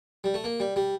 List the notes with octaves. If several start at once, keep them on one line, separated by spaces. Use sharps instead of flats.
G3
A3
A#3
G3
G3